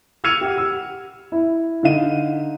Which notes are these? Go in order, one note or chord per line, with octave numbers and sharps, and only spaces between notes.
E6 F6 G#6 C#7 D#7 F7
G4 F#5
E6
E4
D3 D#4 F5 D#7